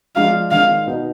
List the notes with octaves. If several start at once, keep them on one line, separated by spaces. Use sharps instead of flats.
F3 G#3 D4 F5
D#3 G#3 D4 F5
B2 B3 D#4